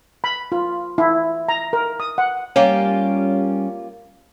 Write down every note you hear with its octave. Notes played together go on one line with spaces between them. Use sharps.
B5
F4
E4
A#5
A#4
D#6
F#5
G3 A#3 C#4 F4 G4